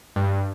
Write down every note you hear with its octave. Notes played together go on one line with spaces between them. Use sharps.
G2